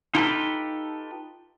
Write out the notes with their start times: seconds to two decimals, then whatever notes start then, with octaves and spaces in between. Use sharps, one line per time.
0.15 D#4 F4 G4 A4 B4